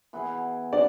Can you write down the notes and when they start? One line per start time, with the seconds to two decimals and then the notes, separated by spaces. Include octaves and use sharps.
0.13 E3 B3 E4 G#4
0.73 F#3 D4 D5